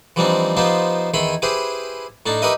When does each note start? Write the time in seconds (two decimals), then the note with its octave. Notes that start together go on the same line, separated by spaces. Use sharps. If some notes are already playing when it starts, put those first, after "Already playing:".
0.16 E3 F3 G3 C4 D4 D#4
0.57 F3 B3 D#4 F4 G4 C5
1.14 E2 D#3 E4 B5 C6
1.42 E4 G4 G#4 B4 C5
2.26 A2 D4 D#4 A5
2.42 D#4 G4 A#4 B4 D#5 E5